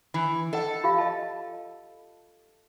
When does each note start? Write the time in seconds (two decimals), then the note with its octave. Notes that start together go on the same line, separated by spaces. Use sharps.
0.14 E3
0.53 A4 D#5 F#5
0.84 F4 G4 F5
0.98 D#5 A5